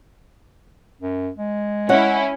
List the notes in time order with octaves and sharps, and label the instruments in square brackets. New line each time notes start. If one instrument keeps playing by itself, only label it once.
[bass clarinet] F#2
G#3
[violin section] C#4 E4 [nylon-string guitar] C#5 F#5